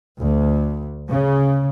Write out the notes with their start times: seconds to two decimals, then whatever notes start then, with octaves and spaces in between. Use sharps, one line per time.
0.19 D2
1.10 C#3